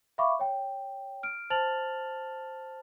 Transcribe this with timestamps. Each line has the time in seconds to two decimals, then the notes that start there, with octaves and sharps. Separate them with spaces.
0.18 E5 F5 B5 C#6 D6
0.39 C#5 G5
1.23 F6 D7
1.50 C5 A5 F6 A6 F7 F#7